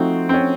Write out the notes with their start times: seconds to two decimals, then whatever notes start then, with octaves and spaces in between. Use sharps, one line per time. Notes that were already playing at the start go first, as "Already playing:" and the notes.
Already playing: F3 A3 C4 D#4 F#4
0.29 C4
0.34 C#4